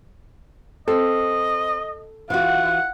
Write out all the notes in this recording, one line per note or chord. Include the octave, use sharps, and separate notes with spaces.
C4 A4 D#5
E3 F4 F#4 F#5